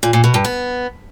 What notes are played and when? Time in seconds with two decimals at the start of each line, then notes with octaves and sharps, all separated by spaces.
0.03 A#2
0.13 A#2
0.24 B2
0.34 G2
0.45 B3